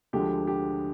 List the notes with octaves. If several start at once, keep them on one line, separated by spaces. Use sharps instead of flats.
D2 D3 F3 G#3 G4
G4